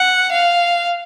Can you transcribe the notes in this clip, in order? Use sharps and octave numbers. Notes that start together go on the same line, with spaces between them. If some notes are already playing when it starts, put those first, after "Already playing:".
Already playing: F#5
F5